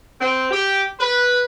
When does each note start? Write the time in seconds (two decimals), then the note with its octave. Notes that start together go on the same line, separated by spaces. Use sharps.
0.20 C4
0.50 G4
0.99 B4